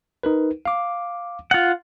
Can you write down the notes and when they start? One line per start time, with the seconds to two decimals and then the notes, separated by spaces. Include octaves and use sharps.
0.23 D#4 A#4 B4
0.65 F5 D6
1.51 F4 F#5